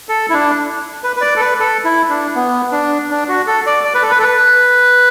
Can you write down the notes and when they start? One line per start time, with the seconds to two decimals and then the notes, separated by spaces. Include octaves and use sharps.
0.09 A4
0.30 E4
0.33 D4
1.03 B4
1.16 B4
1.21 D5
1.36 A4
1.41 B4
1.60 A4
1.85 E4
2.09 D4
2.35 B3
2.72 D4
3.11 D4
3.29 F#4
3.47 A4
3.67 D5
3.85 D5
3.94 B4
4.02 A4
4.11 B4
4.19 A4
4.23 B4